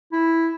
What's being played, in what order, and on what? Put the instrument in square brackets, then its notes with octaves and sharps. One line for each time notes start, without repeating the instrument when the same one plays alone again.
[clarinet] E4